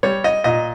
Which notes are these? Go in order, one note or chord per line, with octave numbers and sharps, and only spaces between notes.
G3 C#5
D#5
A#2 D#5